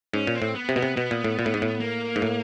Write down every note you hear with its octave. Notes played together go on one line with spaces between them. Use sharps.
G#2 C#4
A#2
C4
A2
B3
C3
B2 B3
C3
B2 B3
A#2
A2
A#2
A2
G#2
A2
A#3
G#2
A2